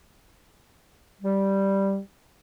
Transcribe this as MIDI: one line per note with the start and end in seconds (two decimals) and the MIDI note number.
1.22 1.97 55